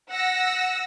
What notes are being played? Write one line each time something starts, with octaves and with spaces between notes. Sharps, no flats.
F#5 E6 A#6